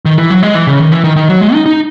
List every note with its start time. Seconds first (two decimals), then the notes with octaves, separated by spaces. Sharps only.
0.05 D#3
0.18 E3
0.30 F#3
0.43 G#3
0.55 E3
0.67 C#3
0.79 D#3
0.92 E3
1.04 D#3
1.16 D#3
1.29 F#3
1.41 G#3
1.53 D#4
1.66 D#4